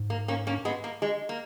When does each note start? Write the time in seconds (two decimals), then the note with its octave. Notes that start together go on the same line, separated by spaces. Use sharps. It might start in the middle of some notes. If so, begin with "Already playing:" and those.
Already playing: G#2
0.10 A#3
0.28 A#3 C#4
0.47 A#3 C#4
0.65 G#3 B3
0.84 A#3
1.02 G#3
1.29 A#3